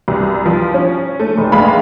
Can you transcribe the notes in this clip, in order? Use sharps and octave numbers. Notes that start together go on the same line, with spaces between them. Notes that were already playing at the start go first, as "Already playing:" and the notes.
C2
F3
C#4
A3
F1
A#1 G#3 F5 B5